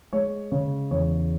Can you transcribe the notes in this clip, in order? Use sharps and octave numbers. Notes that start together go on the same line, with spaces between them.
G#3 C#5
C#3 C#5
E2 C#5